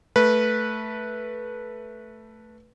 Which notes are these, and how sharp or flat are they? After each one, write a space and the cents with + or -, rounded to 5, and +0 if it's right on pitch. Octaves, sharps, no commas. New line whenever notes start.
A3 +0 B4 -15